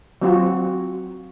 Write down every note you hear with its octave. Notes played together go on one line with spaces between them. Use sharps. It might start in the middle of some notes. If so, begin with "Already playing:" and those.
F#3 C4 F4 F#4